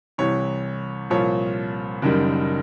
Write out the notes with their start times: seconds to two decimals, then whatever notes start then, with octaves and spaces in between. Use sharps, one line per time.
0.18 C2 C3 E3 C#5
1.10 C2 A#2 F3 C#5
2.02 F#1 F#2 D#3 G3